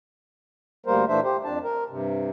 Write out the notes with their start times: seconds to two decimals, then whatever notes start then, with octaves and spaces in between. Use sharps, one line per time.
0.86 D2 G3 A#3 A#4 C5
1.08 A#2 E3 A3 D4 C5 E5
1.24 G4 C5
1.44 F2 D4 A5
1.63 A#4
1.90 G2 C3